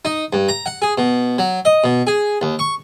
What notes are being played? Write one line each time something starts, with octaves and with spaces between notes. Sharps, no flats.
D#4
G2
A#5
F#5
G#4
B2
F#3
D#5
B2
G#4
D#2
C#6